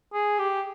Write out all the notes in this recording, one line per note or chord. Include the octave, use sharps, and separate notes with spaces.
G#4
G4